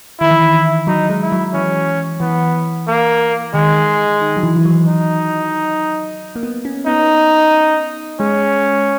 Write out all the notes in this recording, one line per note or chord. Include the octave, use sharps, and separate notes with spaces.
D#3 E4
E3
D#3
E3
F#3 D#4
G#3
E4
F#3
E3 C#4
E3 B3
A#3
D#3 G#3
D#3
F#3
E3
E3
F#3
D#4
A#3
B3
C#4
B3 D#4
G#3 C#4